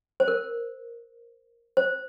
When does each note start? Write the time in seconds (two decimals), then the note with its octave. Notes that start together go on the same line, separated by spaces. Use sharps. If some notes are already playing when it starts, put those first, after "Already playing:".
0.20 C5
0.28 A#4
1.77 C5